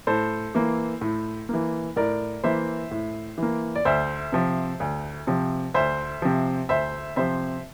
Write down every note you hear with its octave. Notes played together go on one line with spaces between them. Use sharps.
A2 A4 C5
E3 A#3
A2
E3 A#3
A2 A#4 D5
E3 A#3 C5 E5
A2
E3 A#3
D5
D2 C5 E5
C3 F3
D2
C3 F3
D2 C5 E5
C3 F3
D2 C5 E5
C3 F3 C5 E5